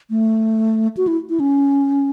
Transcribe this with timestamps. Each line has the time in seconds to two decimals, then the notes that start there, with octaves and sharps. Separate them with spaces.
0.10 A3
0.97 F#4
1.07 E4
1.29 E4
1.40 C#4